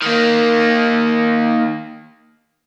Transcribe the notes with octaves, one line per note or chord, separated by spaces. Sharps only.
D#3 A#3